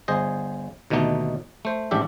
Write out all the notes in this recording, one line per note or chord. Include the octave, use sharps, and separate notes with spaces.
G1 G#4 C5 D#5
D#2 B2 D3 A3 D#4 D#5
A3 C5
A1 G#2 D4 G4 E5